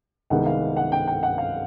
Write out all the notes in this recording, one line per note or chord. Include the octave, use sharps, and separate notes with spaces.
C2 C3 D#3 G#3 B3 F#5
F5
F#5
G5
G5
F#5
F5